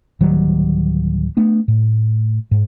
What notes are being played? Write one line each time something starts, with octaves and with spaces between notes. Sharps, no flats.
D1 D#3 F#3 G3
A3 B3 D4
A2
G#2